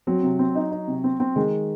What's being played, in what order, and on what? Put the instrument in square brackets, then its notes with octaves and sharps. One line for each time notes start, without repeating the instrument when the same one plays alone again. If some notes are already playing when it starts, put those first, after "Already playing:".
[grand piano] F#3 [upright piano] C4
[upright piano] C3
C4
D#4
D#4
C3
C4
C4
[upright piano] D#3 [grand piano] G#3